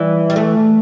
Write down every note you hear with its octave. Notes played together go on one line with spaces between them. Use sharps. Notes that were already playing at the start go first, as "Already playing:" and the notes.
Already playing: E3 G3
G3
A3